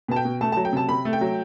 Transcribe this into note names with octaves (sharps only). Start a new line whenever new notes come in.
B2 A5
G5
B2
A3 A5
A5
F#3
G5
C3 A5
C3 B5
A3
G5
F#3